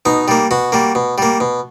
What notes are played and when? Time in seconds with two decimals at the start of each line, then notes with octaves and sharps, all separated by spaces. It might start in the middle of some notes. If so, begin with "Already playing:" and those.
0.06 B2 D#4
0.28 G3 A#3
0.51 B2 F#4
0.72 G3 A#3
0.95 B2
1.18 G3 A#3
1.40 B2